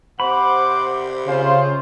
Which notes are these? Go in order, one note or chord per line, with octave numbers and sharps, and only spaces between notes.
C3 C5 F#5 B5 D6
C#3 F4 C5